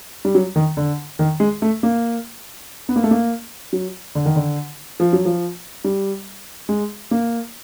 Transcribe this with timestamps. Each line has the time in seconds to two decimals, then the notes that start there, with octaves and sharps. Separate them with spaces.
0.25 G3
0.35 F#3
0.56 D#3
0.77 D3
1.19 D#3
1.40 G#3
1.62 A3
1.83 A#3
2.89 B3
2.96 A#3
3.04 A3
3.11 A#3
3.73 F#3
4.15 D3
4.26 D#3
4.36 D3
5.00 F3
5.13 F#3
5.25 F3
5.84 G3
6.69 G#3
7.11 A#3